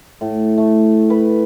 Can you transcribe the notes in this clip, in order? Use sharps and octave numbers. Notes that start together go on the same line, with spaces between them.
A2
A3
B4